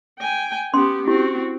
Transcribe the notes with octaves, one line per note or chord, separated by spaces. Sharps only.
G5 G#5
B3 C#4 G4 C6
C4 E4 F#4 G4